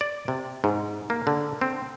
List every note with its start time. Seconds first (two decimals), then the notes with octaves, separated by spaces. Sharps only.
0.01 D5
0.28 C3
0.64 G#2
1.10 A#3
1.27 D3
1.61 C4